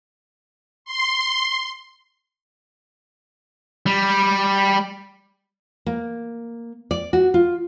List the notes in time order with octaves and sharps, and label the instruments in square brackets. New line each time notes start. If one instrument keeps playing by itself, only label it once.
[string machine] C6
[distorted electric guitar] G3
[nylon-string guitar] A#3
D5
F#4
F4